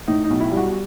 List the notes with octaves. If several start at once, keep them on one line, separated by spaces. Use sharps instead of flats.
A2 D#4
D#4
B1
E4
G3 F#4